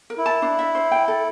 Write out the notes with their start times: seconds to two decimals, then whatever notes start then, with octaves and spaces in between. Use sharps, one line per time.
0.10 A#4
0.18 E4
0.26 A5
0.42 D4
0.59 E5
0.75 C5
0.91 G5
1.08 A4